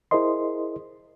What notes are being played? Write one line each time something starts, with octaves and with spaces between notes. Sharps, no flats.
E4 G#4 A#4 C5 D#5 C6